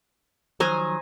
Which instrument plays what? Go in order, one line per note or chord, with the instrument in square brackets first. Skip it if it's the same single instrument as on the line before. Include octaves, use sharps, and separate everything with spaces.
[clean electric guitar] D#3 F3 F#3 [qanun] C5 G#5 A#5